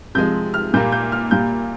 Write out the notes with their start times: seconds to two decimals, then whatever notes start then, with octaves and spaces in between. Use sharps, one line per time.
0.15 C3 F3 G#3 G6
0.54 F6
0.74 A#2 G3 A#3 G6
0.92 G6
1.12 F6
1.31 A#2 G3 A#3 G6